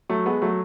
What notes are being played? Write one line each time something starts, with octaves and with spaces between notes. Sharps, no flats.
F#3 A3
G#3 B3
F#3 A3